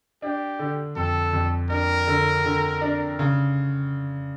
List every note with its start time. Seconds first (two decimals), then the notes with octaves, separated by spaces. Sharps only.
0.22 D4 G4
0.59 D3
0.96 F2 A4
1.33 F2
1.70 D4 A#4
2.07 D3
2.45 D3
2.81 D4
3.19 C#3